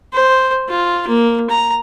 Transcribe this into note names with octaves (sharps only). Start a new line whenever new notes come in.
C5
F4
A#3
A#5